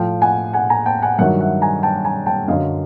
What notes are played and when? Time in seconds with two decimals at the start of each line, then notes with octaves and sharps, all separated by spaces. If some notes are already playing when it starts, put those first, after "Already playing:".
Already playing: A2 F3 F5 G5
0.21 F#5 G#5
0.53 F#5 G#5
0.70 G#5 A#5
0.86 G5 A5
1.02 F#5 G#5
1.18 G2 D#3 F#3 E5 F#5
1.41 E5 F#5
1.62 G#5 A#5
1.83 G5 A5
2.05 G#5 A#5
2.26 G5 A5
2.48 F#2 D3 F#3 D#5 F5